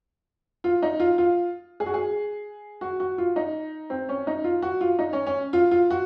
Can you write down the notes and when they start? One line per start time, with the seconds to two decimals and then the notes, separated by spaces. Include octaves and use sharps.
0.64 F4
0.82 D#4
1.00 F4
1.18 F4
1.80 G#4
1.86 F#4
1.94 G#4
2.81 F#4
3.00 F#4
3.18 F4
3.36 D#4
3.90 C4
4.09 C#4
4.27 D#4
4.44 F4
4.62 F#4
4.81 F4
4.99 D#4
5.13 C#4
5.26 C#4
5.53 F4
5.71 F4
5.90 F#4